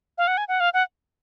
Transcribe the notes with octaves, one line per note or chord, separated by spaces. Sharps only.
F5
F#5
G#5
F#5
F5
F#5